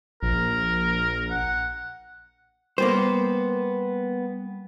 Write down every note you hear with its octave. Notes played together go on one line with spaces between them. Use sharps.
A#1 A#4
F#5
G3 A#3 B3 C5